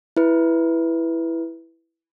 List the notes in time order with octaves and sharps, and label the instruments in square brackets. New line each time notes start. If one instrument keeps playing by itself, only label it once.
[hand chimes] E4 B4